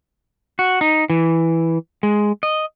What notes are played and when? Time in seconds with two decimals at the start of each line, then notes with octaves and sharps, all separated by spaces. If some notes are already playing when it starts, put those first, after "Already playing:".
0.59 F#4
0.81 D#4
1.10 E3
2.03 G#3
2.43 D#5